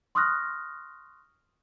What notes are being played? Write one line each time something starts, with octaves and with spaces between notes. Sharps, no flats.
C6 C#6 D#6 F6 F#6 A#6